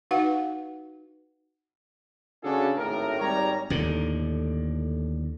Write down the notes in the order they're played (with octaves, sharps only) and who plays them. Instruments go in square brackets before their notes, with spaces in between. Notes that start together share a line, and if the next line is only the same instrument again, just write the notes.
[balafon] D#4 F#4 B4 F5 F#5
[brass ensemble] C#3 C#4 D4 F#4 G#4 A4
G#1 A2 A#4
G#1 G3 C#5 A#5
[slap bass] D#2 A2 D3